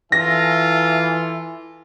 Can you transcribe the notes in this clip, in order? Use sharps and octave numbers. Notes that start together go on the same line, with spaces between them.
E3 F4 A4 E5 G#5 A#6